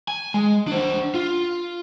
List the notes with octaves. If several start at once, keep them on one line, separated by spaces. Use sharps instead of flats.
G#5
G#3
D4 C5
F4